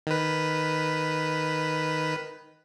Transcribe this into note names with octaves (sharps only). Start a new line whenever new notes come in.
D#3 B4